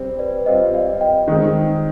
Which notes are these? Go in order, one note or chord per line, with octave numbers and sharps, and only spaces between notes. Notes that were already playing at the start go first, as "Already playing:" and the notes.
Already playing: G3 C4 C5
B4 D5
G3 C4 F4 C5 D#5
D5 F5
D#5 G5
D#3 G#3 C4 D#4